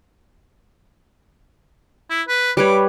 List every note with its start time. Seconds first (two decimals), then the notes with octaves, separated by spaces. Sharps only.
2.10 E4
2.28 B4
2.57 G3 B4 C#5 D6